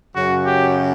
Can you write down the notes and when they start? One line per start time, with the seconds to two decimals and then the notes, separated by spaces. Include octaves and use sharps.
0.15 F#2 C#3 F#3 F#4
0.46 G4